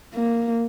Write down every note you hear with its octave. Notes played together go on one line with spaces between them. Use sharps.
A#3